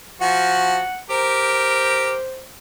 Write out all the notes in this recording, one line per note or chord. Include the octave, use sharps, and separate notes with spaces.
F3 F#4 F#5
G4 A#4 C5